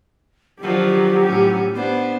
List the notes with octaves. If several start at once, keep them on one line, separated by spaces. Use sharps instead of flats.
D#3 F3 F#3 D4 G4
A2 C#4
B3 D4 C5